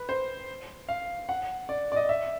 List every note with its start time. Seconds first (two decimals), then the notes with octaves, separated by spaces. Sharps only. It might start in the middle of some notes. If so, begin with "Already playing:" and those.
Already playing: B4
0.09 C5
0.89 F5
1.29 F#5
1.69 D5
1.92 D5
1.96 D#5
2.09 E5